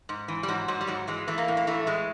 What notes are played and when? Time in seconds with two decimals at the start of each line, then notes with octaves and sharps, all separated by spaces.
0.09 G#2
0.28 E3
0.43 G3
0.48 G#2 F#3
0.68 G#2 F#3
0.81 G3
0.88 G#2 F#3
1.08 E3 G#3
1.28 E3 A3
1.38 A#3
1.48 A2
1.57 A#3
1.67 E3 A3
1.87 A2 G#3